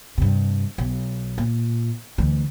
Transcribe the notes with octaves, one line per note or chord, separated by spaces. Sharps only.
G2 C3
B1
A#2
D2 E3